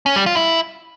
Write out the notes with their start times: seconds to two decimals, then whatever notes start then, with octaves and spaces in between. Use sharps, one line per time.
0.06 C#4
0.16 G3
0.26 F4
0.37 E4